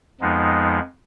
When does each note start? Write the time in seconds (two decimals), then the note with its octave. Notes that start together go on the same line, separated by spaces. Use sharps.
0.21 F2 F3 G#3 B3 D#4